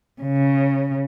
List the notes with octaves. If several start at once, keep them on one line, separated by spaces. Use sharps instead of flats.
C#3